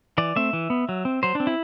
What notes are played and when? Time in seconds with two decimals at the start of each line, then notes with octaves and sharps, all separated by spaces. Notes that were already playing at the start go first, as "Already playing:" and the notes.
0.18 E3 D5
0.36 A3 C4 E5
0.53 E3
0.70 B3
0.89 F#3
1.05 C4
1.23 F#3 C5
1.35 C4 D4
1.47 E4